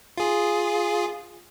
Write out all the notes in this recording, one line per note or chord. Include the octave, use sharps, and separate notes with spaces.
F4 G#4